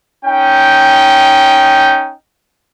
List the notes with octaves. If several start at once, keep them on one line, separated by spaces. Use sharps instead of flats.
C#4 D#4 G5